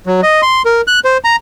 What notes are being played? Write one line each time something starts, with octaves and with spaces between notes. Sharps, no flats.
F#3
D#5
C6
A#4
F#6
C5
A#5